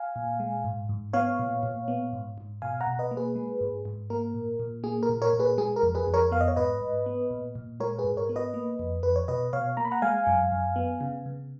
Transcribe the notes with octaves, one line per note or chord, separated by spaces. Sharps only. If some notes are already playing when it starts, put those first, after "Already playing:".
Already playing: F5 G#5
A#2
G#3
G#2
G#2
B3 C#5 F5
A#2
A#2
B3
G#2
G#2
B2 F5 G#5
F#5 A#5
B2
B4 D#5
A#3
G#4 B4
G#3
G#2
G#2
A#3 A#4
A#2
A#2
A#3 G#4
A#4
A#2
A#4 C#5
A#2
G#4 B4
G#3 G#4
A#4
F2
G#4 B4
F2
A#4 C#5
B3 F5
D#5
C#5
G#2 B4 D#5
G#2
B3
A#2
A#2
G#3 A#4 C#5
G#4 B4
G#2
A#4 C#5
B3
B4 D#5
A#3
F2
F2 B4
C#5
B2 B4 D#5
B2 C#5 F5
A#3 A#5
B5
F#5 A#5
G#3 F5 G#5
F#2
F#2
B3
C#3
C#3